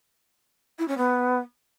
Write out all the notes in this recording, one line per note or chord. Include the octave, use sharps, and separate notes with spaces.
E4
C#4
B3